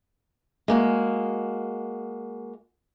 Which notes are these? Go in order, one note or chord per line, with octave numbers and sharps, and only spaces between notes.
G#3 A#3 F#4